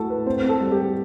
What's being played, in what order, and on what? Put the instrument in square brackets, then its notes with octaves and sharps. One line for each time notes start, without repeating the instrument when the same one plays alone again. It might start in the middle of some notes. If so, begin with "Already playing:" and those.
Already playing: [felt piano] A3 E4 [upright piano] F#4 A4
[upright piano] B4
[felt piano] C4 [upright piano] C5
[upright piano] A4
[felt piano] G3
[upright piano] G4